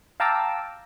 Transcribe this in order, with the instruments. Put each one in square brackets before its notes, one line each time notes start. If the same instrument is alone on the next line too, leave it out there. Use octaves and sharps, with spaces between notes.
[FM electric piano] F5 G5 A5 A#5 D6 E6